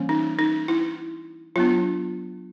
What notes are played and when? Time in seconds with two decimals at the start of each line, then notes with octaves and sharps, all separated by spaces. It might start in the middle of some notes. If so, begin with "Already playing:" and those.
Already playing: E3 G3 A#3 C#4
0.09 D#4
0.39 D#4
0.68 E4
1.56 F#3 B3 D4 F4